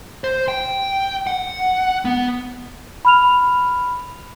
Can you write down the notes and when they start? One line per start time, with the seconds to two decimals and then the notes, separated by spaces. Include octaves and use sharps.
0.24 C5
0.48 G5
1.27 F#5
2.05 B3
3.05 B5 F6 F7